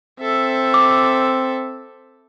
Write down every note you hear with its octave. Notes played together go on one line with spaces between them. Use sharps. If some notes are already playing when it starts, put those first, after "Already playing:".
C4 A4 E5
D6